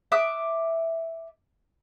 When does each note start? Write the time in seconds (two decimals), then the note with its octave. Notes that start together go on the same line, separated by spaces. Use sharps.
0.12 E5 D6 D#6 F#6